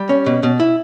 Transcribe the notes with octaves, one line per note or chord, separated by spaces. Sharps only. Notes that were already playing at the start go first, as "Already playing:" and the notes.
Already playing: G3
C#4
B2
B2
E4